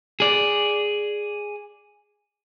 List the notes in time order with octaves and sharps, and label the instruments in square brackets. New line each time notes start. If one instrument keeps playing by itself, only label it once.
[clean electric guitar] G#4 D5